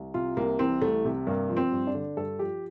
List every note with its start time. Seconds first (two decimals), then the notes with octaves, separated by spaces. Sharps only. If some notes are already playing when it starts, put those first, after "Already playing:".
Already playing: C2
0.14 C3 F4
0.37 C2 A#3
0.59 E3 C4
0.82 C2 A3
1.05 C3
1.27 G2 A#3
1.49 F3
1.57 C4
1.72 G2
1.87 D4
1.95 D3
2.17 G2 A4
2.39 F3 G4